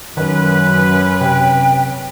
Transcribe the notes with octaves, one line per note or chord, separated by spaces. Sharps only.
F#2 D#3 C#4 B4
C3 G5